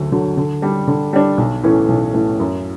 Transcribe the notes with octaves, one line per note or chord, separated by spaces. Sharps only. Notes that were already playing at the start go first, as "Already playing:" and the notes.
Already playing: D2 D3 F#3
D3 F#3
D3
G3 D4
D3
G3 D4
B1
A2 E3 A3 C#4
B1
A2 E3 A3 C#4
F#2